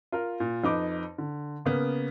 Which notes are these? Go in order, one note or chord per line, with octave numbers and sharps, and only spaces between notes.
F4 A#4
A#2
F2 D#4 B4 D6
D3
C#3 A#3 B3